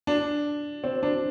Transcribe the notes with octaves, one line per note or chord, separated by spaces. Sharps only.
D4
C4
D4